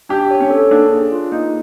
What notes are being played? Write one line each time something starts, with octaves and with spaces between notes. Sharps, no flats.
D4 G4
C#5
C#4
A4
A#3 D4
G#4
F4
A#3 D#4